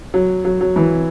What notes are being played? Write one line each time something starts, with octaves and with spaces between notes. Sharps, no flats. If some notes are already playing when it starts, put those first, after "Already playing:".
F#3
F#3
F#3
E3